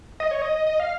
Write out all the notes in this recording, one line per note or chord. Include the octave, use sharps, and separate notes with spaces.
D#5
C#5
D#5
D#5
F5